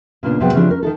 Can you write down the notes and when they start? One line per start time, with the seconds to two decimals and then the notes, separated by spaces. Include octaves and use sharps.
0.23 A#2 C#3 A#3 B3 D4
0.40 G#2 C3 F#3 B3 C5 G5
0.53 C#3 E3 F3 G3 C4 D4
0.69 C#4 A#4
0.83 D#3 D#4 A4